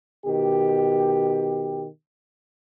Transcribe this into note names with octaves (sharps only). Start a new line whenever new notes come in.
B2 D#3 G4